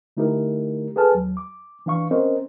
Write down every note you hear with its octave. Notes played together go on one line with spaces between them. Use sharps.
D3 A3 D#4 E4 G4 A#4
G#4 A4 B4 G#5 A5 F6
D#2 F#3
D6
E3 D4 F5 C#6
C4 C#4 A#4 C5 D#5